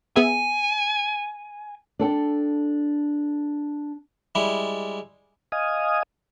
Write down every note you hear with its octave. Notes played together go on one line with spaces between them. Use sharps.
B3 G#4 E5 G#5
D4 A4 G5
G3 G#3 E4
D#5 F5 G#5 D#6